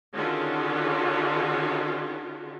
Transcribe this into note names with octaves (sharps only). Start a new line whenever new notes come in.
D3 D#3 C#4 F4 F#4 G#4